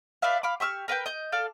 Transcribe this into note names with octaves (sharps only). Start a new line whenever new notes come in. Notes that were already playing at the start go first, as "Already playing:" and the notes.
B4 D5 E5 F5
F5 B5 D6
G4 C#6 E6 F6
A#4 B4 F#5 G5
D#5 G6
A4 D5 F5